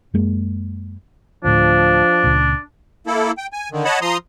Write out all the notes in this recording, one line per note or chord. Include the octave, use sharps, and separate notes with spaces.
F#2 G#3 A#3
D2 A2 F3 D4
C#2 A#2
A#3 E4 A4
G5
G#5
D3 D#3
C#5 D#5 F#5 A5 B5
F3 A#5 C6 D#6